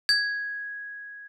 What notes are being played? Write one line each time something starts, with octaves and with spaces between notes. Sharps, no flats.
G#6